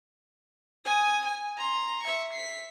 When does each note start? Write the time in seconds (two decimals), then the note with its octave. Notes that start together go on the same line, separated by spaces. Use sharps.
0.85 G#5 D#6
1.25 G#5
1.58 A#5 C6
2.02 E5 C#6
2.32 B6 C7